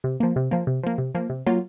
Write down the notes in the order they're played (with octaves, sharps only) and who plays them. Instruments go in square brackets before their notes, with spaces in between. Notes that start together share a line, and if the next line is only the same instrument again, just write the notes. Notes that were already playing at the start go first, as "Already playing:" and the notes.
[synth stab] C3
F3 A#3
C3
F3 A#3
C3
F3 A#3
C3
F3 A#3
C3
F#3 A#3 F4